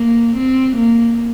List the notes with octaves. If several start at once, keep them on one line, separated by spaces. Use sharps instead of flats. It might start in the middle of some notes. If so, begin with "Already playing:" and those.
Already playing: A#3
C4
A#3